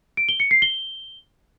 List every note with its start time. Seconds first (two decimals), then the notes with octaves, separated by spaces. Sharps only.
0.17 D7
0.29 G7
0.40 C#7
0.51 C7
0.62 G7